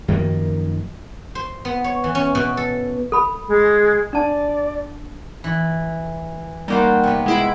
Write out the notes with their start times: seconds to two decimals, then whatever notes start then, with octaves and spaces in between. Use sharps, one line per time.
0.08 F#2 D#3 F3 A#3
1.35 C5
1.65 B3
1.84 C#5
2.04 E3
2.15 C#4
2.35 B2
2.57 A4
3.12 A4 B5
3.48 G#3
4.13 D4 D5 A5
5.44 E3
6.68 G3 A#3 D#4 F#4 C5
7.04 C3 B3
7.26 G#3 E4 D7